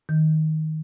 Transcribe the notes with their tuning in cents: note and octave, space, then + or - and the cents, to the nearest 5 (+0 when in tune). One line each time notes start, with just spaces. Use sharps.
D#3 +10